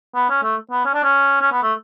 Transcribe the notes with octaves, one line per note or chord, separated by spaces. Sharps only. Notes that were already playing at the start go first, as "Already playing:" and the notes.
B3
C#4
A3
B3
C#4
D4
C#4
C#4
B3
A3